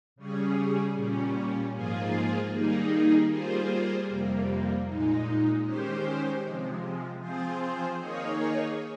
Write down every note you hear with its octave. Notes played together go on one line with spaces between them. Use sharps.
C#3 G3 C#4 G#4
A#2 G3 C#4
G#2 F3 A#3 F4 G#4
D#3 G3 A#3 D#4 G#4
G3 A#3 F4 G#4 C5
F2 C3 G3 A#3
A#2 G#3 D#4
D#3 G#3 C#4 G4 C5
C3 F3 G#3
F3 C4 F4 G#4 C5
D#3 A#3 D#4 G#4 C#5